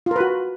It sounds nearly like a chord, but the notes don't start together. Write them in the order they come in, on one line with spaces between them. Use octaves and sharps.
F4 A#4 B4 F#4